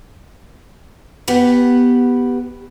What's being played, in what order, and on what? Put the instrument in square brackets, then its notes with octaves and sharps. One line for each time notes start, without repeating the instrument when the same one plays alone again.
[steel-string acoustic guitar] B3 G4 B4 F#5